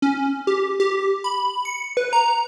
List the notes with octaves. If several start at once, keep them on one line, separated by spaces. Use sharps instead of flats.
C#4
G4
G4
B5
C#7
B4
A#5